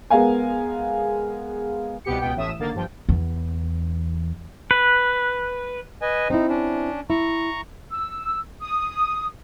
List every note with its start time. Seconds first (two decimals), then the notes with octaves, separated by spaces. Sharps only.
0.10 G#3 B3 A#4 F5 G#5
2.05 C2 B2 B3 G4 C#7
2.20 C#2 B2 B3 G5
2.36 A1 A2 E5 D#6 E7
2.59 G#1 D3 A#3 A6
2.75 G2 F3 G5
3.09 E2
4.71 B4
6.01 B4 D#5 G#5
6.30 C4 D#4 E4
6.49 C#4 D4
7.10 E4 A#5 C#6
7.91 E6
8.61 D#6